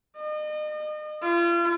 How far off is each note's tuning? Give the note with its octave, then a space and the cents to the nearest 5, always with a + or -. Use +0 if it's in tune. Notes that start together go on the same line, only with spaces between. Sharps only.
D#5 -35
F4 -35